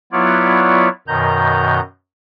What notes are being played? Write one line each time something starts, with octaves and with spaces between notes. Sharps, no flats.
F#3 B3 E4 F4 C#5 D5
F#2 B2 D#3 A#5 G6